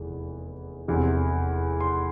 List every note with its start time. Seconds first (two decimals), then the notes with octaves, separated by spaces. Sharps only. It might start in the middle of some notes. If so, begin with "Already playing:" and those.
Already playing: F1 E2
0.88 F1 E2 C3
1.80 C6